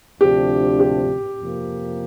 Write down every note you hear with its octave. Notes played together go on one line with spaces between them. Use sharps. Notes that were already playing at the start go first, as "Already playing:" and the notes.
D2 C3 F3 D4 G4
G4
F2 C3 F3 A#3